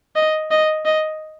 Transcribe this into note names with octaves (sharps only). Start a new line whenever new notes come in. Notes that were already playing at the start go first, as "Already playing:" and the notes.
D#5
D#5
D#5